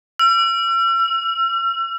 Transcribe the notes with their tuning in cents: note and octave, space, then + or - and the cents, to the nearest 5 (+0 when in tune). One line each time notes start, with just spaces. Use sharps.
E6 +45
E6 +35